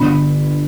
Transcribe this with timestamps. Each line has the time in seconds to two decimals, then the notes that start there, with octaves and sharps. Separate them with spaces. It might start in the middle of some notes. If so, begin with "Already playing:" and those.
Already playing: G1 B5